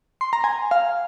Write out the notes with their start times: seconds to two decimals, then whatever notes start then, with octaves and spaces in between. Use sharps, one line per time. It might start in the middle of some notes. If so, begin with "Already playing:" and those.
0.21 C6
0.33 A#5
0.44 G#5
0.71 F5